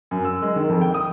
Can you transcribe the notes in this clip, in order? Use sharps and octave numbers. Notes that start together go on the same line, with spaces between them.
F#2
E6
G#3
D#3
F2
G5
D#6